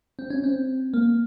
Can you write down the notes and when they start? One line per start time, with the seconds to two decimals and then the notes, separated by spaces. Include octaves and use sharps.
0.19 C4
0.30 C#4
0.44 C4
0.94 A#3